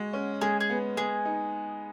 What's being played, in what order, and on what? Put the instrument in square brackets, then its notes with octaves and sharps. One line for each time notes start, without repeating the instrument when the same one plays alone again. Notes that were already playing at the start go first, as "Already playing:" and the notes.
Already playing: [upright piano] G#3 [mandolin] F#4
[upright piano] C#4
[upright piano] G#3 [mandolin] G#4
[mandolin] G#4
[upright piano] B3
[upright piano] G#3 [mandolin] G#4
[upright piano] D#4